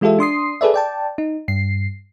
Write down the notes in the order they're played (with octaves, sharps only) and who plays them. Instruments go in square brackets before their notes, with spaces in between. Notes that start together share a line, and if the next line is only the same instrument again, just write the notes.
[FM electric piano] E3 G#3 F4 G4 A4 E5
D4 C6 D#6 C7
G#4 A4 B4 D5 E5
D5 G5 A5
D#4
G2 C7